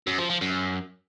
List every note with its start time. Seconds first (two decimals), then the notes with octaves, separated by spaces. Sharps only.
0.07 F#2
0.18 F3
0.30 F3
0.41 F#2